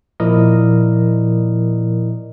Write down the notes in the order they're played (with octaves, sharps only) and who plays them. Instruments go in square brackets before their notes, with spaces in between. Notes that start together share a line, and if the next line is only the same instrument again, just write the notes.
[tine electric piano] A#2 F3 E4 A#4 D5 D#5